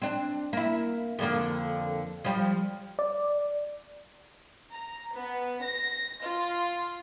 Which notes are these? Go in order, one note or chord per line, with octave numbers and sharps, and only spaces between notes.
C4 D4
A#3 E4
F2 D3 A#3
F3 G3
D5
A#5
B3
A#6
F4